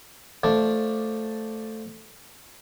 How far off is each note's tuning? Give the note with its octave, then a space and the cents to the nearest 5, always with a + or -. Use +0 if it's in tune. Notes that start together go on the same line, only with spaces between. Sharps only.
F3 +10 A3 +0 D4 +0